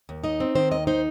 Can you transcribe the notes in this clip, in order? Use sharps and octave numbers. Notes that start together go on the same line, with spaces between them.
D#2
D#4 D#5
C4
D#3 C5
D#2 D#5
D#4 C5